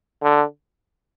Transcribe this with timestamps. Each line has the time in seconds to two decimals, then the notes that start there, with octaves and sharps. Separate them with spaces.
0.22 D3